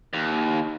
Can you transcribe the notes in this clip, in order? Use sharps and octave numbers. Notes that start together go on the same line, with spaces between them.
D#2